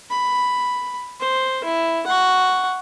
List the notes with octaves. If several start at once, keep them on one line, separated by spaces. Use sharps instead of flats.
B5
C5
E4
F#5 C#6